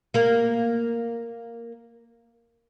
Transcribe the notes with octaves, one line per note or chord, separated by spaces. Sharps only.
A#3 A#4